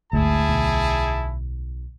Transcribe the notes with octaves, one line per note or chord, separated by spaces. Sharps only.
G#1 D2 G#2 E4 G#4 A5
B1